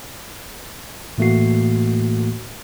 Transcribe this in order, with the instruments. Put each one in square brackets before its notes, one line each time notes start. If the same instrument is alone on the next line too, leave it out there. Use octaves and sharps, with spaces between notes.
[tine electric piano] A2 E3 A3 A#3 F#4 C7